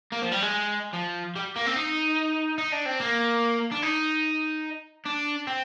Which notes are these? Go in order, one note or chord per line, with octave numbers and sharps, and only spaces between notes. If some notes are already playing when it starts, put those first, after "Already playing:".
A#3
F3
G3
G#3
F3
G3
A#3
C4
D#4
D#4
D4
C4
A#3
D4
D#4
D4
C4